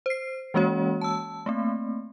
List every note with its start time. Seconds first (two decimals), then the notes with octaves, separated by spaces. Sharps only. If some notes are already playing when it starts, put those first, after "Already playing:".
0.06 C5 C7
0.54 E3 G#3 A#3 C#4 F#4 C#5
1.01 A5 E6
1.46 A3 A#3 C4